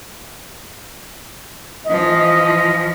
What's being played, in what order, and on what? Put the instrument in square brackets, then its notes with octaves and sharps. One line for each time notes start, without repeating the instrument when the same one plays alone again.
[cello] E3 F3 [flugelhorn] D#5